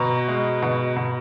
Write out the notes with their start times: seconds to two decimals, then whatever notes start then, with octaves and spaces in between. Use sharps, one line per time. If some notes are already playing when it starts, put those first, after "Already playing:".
Already playing: B2 A#5 C#6
0.28 G#3
0.62 B2
0.96 B2